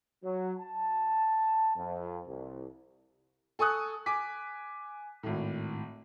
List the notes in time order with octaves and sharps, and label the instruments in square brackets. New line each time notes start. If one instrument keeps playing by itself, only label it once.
[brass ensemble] F#3
A5
F2
C2
[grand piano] A4 G#5 C#6 D#6 F#6
G#5 D6 B6
G#1 A2